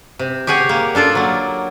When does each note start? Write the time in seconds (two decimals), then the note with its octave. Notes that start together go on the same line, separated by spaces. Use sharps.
0.19 C3
0.47 G4 G#4 C#5 F#5 G#5
0.69 A#3
0.95 D4 F4 A4 D5
1.15 F#3 A#3